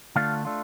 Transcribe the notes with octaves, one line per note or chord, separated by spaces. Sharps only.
D3 A3 D4 F4 F5
A3 D4 F4